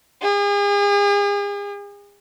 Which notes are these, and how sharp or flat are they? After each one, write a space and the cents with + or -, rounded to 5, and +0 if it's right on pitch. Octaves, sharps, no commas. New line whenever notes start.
G#4 -40